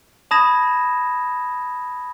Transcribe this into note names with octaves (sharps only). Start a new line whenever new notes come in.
A5 B5 D#6 G#6 A#6 E7